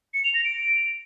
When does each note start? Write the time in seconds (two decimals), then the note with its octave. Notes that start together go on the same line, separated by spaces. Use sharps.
0.14 C#7
0.24 F7
0.34 A#6
0.44 D7